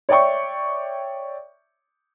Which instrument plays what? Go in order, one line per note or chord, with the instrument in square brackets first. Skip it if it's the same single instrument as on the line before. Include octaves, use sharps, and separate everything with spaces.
[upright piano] C#5 D5 E5 G5 C#6